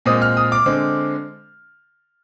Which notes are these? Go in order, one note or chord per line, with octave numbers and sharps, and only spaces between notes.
A#2 G#3 C4 D#6
F6
D#6
D6
D3 G#3 C4